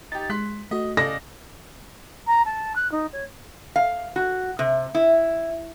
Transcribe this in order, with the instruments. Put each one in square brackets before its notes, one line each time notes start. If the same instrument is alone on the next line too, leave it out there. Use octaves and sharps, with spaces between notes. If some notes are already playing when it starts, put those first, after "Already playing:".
[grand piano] D#4 G4 [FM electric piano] A6
[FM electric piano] G#3 [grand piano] C6 F#6 B6
[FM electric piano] A3 F#4 [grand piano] D#5
[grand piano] C#3 D5 D#5 [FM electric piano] A4 [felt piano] A#6
[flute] A#5
A5
F#6
D#4
C#5
[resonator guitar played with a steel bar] F5
F#4
C3
E4